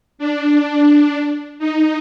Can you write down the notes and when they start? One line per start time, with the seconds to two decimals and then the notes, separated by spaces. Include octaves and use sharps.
0.19 D4
1.59 D#4